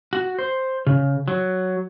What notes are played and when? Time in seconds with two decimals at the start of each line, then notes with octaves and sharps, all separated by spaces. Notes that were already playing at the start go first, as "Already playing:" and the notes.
0.13 F#4
0.39 C5
0.87 C#3
1.28 F#3